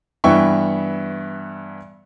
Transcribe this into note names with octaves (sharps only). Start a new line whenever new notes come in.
G2 E3 B3 E5 G5 C#6